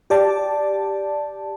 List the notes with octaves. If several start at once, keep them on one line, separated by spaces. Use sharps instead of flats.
G4 D5 A5